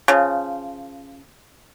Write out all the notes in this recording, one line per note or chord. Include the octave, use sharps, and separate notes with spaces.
C#3 F3